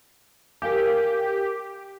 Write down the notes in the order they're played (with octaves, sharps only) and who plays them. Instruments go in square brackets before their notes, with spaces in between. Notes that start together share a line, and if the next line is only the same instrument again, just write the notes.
[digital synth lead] G4 [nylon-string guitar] A#4 F5 G#5